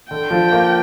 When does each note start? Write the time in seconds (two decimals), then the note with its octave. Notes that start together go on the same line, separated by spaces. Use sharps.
0.11 D3 G5
0.31 F3
0.52 A#3